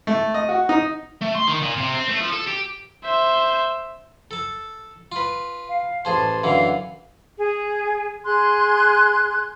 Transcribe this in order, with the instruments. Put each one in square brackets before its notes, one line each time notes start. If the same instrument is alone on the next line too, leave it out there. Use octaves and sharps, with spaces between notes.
[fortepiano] A3
D#5
F#4
D#4
[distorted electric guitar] A3
C6
D#3
A#2
C3
C4
A3
F3
A4
G4
[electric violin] C5 E5
[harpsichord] A4 A5
F4 B4
[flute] F5
[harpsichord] A1 G#4 C5 [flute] A5
[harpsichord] F#2 D3 E3 [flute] F5
[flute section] G#4
G#4 C6 F#6 G#6